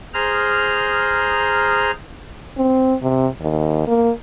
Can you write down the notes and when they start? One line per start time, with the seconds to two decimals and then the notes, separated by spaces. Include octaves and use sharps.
0.14 G#4 C5 A#5 F6
2.58 C4
3.02 C3
3.41 D#2
3.88 A#3